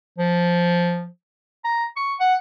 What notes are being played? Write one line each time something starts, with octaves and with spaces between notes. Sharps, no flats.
F3
A#5
C#6
F#5